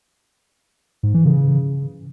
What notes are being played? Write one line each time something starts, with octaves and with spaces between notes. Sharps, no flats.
G#2
E3
C#3